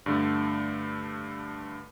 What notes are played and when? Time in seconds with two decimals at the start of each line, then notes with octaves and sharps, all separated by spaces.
0.06 G2 D3 A3